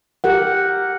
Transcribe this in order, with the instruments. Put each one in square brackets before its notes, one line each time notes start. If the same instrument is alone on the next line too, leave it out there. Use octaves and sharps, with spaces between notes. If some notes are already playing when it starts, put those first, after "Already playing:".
[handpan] G4 A#4 F#5